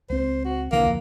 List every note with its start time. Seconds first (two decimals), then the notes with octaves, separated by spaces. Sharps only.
0.10 C#2 C4 C5
0.45 F#4
0.72 B1 D3 E3 A#3
0.86 D#1 F2